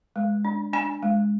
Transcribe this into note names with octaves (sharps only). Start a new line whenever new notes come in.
G#3
D4
D4 G#5
G#3